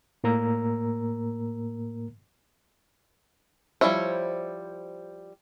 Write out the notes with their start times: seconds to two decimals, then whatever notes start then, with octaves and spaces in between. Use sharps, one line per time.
0.24 A2 A#3 A#4 A#5 E6
3.81 F3 G3 A3 E4 C#5